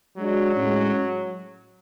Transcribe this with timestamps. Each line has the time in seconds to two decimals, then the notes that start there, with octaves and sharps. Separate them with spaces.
0.17 F#3 G#3 D4 F#4
0.54 A2 G#3 C#4